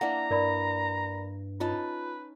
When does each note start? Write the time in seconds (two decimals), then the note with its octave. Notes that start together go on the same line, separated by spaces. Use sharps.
0.01 A#3 D4 E4 F#5 A#5
0.31 G2 A#4 D5 B5
1.60 C#4 D#4 F4 B4 A5